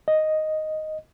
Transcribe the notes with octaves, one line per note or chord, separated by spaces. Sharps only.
D#5